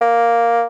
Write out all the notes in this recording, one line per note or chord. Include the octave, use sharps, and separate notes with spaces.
A#3